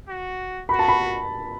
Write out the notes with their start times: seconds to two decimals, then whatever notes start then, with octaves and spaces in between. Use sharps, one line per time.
0.09 F#4
0.69 F#4 B5
0.79 A5
0.88 B5